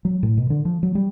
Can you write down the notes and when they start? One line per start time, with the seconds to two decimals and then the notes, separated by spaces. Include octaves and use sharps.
0.05 F#3
0.23 A2
0.37 B2
0.50 D3
0.65 F3
0.83 F#3
0.95 G3